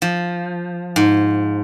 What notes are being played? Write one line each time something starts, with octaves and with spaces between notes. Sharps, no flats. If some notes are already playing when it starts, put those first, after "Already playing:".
F3
G#2